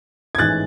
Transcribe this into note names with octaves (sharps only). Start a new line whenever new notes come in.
G#6
A1 G#2 E3 G#3 F#6 A6